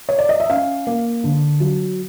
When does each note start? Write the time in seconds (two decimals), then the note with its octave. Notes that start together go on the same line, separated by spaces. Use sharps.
0.09 C#5
0.19 D5
0.29 D#5
0.40 E5
0.50 C#4 F5
0.87 A#3
1.24 D3
1.60 F#3